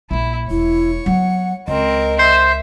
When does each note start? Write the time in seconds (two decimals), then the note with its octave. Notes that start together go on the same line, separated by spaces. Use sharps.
0.11 A#1 A#3 E4
0.50 E1 E4 C#5
1.06 F#3 B3 F#5
1.68 C#2 C4 A#4 D#5
2.19 C5 E5